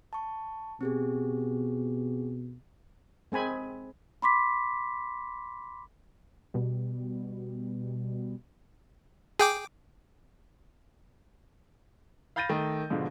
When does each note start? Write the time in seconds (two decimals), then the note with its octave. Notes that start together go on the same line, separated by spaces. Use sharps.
0.13 A5 C#6
0.81 B2 C4 G4 G#4
3.32 G#3 C4 G#5 B5
4.22 B5 C6 D6 B6
6.54 B2 G3
9.39 G#4 G5 D6
12.36 F5 B5 G6 A6 A#6 D#7
12.49 D#3 A3
12.90 G#2 B2 D3 F3